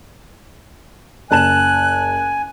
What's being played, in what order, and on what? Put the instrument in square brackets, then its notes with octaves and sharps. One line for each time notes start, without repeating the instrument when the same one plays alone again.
[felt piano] F#1 A5 E7 [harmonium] G#5 [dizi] F#6